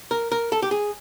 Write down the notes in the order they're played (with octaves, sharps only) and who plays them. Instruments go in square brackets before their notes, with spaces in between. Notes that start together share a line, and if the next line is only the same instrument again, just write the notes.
[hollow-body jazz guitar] A#4
A#4
A4
G4
G#4